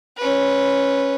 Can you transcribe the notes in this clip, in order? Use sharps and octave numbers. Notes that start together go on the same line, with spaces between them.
C#4 B4